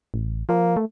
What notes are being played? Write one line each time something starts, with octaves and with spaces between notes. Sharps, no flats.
A1
F3 A#3
A3